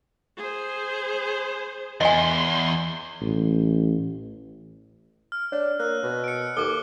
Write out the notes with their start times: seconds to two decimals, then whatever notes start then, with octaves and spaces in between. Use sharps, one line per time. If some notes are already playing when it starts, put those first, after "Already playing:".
0.37 G#4 C5
2.01 E2 D#5 G#5 C6
3.21 A1
5.32 F6
5.52 D4 C#5
5.79 A#3 E6 F#6
6.03 B2
6.24 C#7 D7
6.57 D#2 A4 A#4 D6 G7